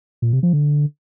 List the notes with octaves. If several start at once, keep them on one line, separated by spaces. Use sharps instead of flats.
A#2
C3
F3
D3